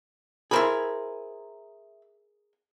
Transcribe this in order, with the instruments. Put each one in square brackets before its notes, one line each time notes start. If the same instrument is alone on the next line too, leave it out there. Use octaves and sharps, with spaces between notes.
[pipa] E4 C5 B5 [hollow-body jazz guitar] G#4 A#4